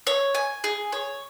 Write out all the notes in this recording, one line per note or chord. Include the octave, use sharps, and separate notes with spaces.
C#5
G#5
G#4
C#5